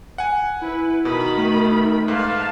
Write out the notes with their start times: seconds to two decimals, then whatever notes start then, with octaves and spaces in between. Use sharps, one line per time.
0.18 F#5 G#5
0.62 E4 B4
1.05 B2 D#3 B5
1.37 A3
2.08 G#2 B4 F5 A5